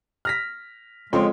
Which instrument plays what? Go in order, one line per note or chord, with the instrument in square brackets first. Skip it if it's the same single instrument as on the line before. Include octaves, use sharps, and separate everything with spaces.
[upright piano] F6 A#6 B6
[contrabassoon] F2 [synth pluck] C#3 C4 [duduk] G#3 [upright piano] C#5 G5 C6